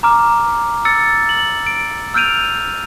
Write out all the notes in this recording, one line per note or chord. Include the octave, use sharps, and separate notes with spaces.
A#5 D6 F6
E6 A6 C#7
F#7
D7
E6 F6 G6 D7 D#7 F7